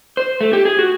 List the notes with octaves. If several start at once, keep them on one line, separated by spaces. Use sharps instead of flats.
C5
A3
G4
G#4
F#4